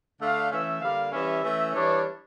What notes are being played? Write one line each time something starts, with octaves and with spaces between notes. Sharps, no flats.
D3 A3 D4 F5
E3 A3 C#4 E5
D3 G3 A#3 F5
E3 G3 C#4 E5
E3 A3 C#4
E3 G3 D4 C#5